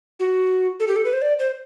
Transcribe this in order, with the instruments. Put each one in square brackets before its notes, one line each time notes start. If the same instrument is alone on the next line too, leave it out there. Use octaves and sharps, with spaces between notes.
[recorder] F#4
A4
G4
A4
B4
C5
D5
C5